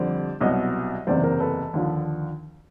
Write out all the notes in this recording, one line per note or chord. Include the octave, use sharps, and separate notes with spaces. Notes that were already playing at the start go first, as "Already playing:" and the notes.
Already playing: F2 D3 G3 C5 D5
C2 B2 F#3 C#5 D#5
F#1 E2 C3 C5 D5
A#4 C5
A4 B4
D#2 D3 F3